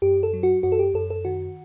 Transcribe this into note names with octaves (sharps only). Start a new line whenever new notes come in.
F#2 G4
A4
F#3
F#4
F#2 F#4
A4
G4
F#2 A4
A4
D#3 F#4